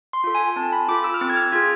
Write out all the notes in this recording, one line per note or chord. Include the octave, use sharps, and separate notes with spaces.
C6
F4 A4
G#5
C4 A5
B5
F4 A4 D6
E6
F6
C4 E6
G#6
F6
F4 G#4 G#6